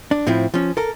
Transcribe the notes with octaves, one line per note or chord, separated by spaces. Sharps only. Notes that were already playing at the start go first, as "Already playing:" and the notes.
D4
A2 F3 C4 E4
F3 C#4
A4 A#4